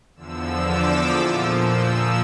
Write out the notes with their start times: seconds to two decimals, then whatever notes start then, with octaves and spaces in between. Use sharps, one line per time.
0.16 E2 D3 F3 E6
0.62 D6
1.09 A#2 F3
1.55 E6